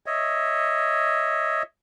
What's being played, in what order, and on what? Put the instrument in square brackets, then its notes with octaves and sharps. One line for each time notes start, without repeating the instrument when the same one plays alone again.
[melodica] C#5 D#5 E5